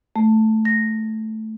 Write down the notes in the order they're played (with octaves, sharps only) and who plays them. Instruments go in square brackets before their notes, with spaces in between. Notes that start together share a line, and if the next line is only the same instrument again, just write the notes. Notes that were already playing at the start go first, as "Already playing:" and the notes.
[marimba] A3
A#6